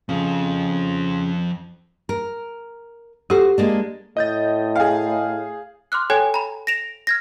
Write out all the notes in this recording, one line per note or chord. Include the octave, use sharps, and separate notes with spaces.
F2 C#3 F3
A#4
F#4 G4 A4 C5
G#3 A#3 D4
A2 D#5 G6 A6
G#4 F5
C6 D6 F6 F#6
A4 C#5 G5 G#5 F#6 G#6
A#5 B5
A#6 D7 E7 F7
F6 G#6 A#6